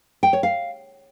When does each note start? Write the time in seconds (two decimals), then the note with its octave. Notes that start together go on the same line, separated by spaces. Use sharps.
0.23 G5
0.33 C#5
0.43 F5